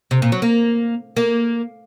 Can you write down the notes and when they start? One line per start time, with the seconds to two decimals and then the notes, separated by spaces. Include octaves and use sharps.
0.11 C3
0.22 A#2
0.32 F#3
0.42 A#3
1.17 A#3